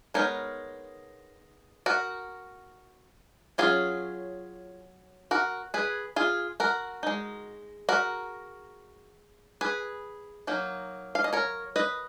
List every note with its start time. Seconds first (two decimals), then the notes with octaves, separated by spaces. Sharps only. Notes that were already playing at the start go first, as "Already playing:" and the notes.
0.14 G#3 B3 D#4 A#4 C#5
1.86 F#4 A#4
3.58 F#3 C#4 F4 G#4
5.31 F#4 A#4
5.74 G#4 B4
6.16 F4 G#4
6.60 F#4 A#4
7.03 G#3 D#4
7.89 F#4 A#4
9.61 G#4 B4
10.47 F#3 A#3 D#4
11.15 F5
11.24 D#5
11.33 A#4 C#5
11.76 B4 D#5